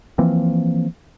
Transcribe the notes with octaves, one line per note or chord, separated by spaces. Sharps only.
E3 F3 A#3 C4